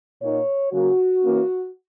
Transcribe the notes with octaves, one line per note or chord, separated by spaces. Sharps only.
A#2 A#3 D#4 C#5
C#3 F#3 A#3 F#4
E3 A#3 C#4